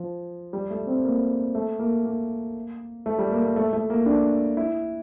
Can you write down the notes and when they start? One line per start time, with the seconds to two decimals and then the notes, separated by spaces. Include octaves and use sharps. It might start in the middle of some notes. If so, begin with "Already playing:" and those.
Already playing: F3
0.53 G3
0.70 A3
0.87 C4
1.05 A#3
1.55 A3
1.79 A#3
2.05 A#3
3.06 A3
3.19 G3
3.32 A#3
3.43 A#3
3.56 A3
3.73 A3
3.90 A#3
4.06 D4
4.57 E4